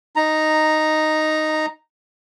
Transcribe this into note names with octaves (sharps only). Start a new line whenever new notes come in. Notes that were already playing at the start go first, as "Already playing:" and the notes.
D#4 A#5